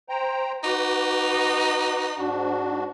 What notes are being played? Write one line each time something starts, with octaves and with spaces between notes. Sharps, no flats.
C5 G5 A#5
D#4 F#4 B4 D6
G#2 D4 F#4